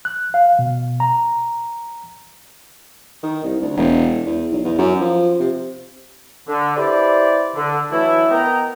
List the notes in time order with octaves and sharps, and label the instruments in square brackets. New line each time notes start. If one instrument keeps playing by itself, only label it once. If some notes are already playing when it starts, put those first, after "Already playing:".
[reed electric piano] F#6
F5
B2
A#5
[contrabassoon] D#3
C2
D2
E1
E2
B1
E2
F#2
F3
C3
[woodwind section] D3
E4 G4 B4 C5 D5
D3
E3 F#3 A3 D4 E4
B3 A#4 D#5 G5 A#5